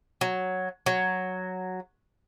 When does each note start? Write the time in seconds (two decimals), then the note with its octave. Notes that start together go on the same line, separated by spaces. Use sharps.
0.21 F#3
0.86 F#3